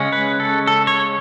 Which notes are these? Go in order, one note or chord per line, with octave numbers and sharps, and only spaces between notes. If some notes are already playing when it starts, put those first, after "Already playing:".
Already playing: C#3 G#3 C#4
B4
A4
A4
C#5